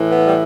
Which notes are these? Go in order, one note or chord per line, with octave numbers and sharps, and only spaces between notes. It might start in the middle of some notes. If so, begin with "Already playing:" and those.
Already playing: A2 E3
B3
G3